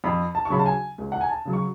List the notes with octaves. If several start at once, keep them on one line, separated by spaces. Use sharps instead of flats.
F2 B5
A5
C#6
C#3 F#3 B5
A5
G#5
C#2
F#5
G#5
A5
C#3 F#3
C#6